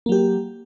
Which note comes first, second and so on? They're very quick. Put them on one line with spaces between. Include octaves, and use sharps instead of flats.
A#3 F#3 G4